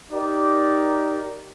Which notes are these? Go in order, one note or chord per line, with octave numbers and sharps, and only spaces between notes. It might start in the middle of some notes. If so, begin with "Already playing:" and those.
D#4 G4 A#4 D5